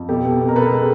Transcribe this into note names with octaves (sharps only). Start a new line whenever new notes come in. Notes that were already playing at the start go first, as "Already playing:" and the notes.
Already playing: F2
B2 G4 A4
B2
B2
A#4
B2 A4 B4
G#3